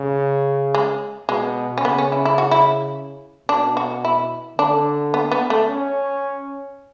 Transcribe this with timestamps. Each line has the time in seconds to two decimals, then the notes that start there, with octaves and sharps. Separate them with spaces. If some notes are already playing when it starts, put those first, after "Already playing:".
Already playing: C#3
0.74 G#3
1.29 B2 G#3
1.78 C#4
1.84 C#3 B3
1.98 C#4
2.12 E4
2.25 E4
2.38 F#4
2.51 E4
3.49 B2 D4
3.77 F#4
4.05 E4
4.58 D3 D4
5.14 B3
5.31 B3
5.50 A3
5.69 C#4